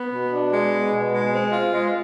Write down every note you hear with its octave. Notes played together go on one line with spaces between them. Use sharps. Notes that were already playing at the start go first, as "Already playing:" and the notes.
Already playing: B3
B2
D4
G#3
B3
B2
G#3
C4
F4
G#3